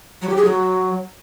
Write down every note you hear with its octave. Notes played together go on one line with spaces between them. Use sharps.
F#3
G4
G#4
F#3